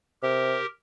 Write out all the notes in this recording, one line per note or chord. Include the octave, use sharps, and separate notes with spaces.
C3 G4 A#4